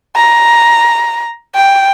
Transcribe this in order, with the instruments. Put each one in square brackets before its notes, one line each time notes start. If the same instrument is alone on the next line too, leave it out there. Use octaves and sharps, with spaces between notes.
[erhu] A#5
G5